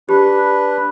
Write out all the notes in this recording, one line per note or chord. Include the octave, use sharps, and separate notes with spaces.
D4 G4 B4